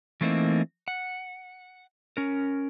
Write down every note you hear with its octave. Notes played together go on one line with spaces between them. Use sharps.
E3 A3 A#3 C4 D#4
F#5
C#4 A#4